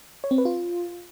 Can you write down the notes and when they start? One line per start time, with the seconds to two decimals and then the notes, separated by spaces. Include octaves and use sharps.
0.24 C#5
0.31 C4
0.38 B4
0.45 F4